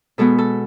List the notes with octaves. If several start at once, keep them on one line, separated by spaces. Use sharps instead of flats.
B2 G#3 B3 A4
A4